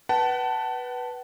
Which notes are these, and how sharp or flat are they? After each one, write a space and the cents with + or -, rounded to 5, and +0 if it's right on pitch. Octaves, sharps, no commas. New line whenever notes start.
B4 -5 F#5 +40 A5 +0